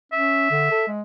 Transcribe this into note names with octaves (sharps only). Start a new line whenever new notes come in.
C#4 E5
D3
A4
G#3